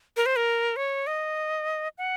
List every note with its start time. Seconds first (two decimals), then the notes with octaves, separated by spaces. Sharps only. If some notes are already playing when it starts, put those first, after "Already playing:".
0.17 A#4
0.26 C5
0.36 A#4
0.76 C#5
1.07 D#5
1.98 F#5